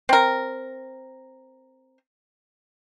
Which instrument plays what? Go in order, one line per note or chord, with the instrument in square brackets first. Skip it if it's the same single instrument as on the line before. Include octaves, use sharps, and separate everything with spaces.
[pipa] C4 A#4